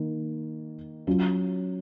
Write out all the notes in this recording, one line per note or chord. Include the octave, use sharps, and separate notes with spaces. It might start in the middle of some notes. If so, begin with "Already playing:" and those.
Already playing: D#3 A#3 D#4
F#3 C#4 F4